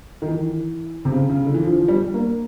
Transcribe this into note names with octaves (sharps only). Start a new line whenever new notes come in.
D#3
E3
C3
C#3
C#3
D3
E3
F3
F3
G3
A#3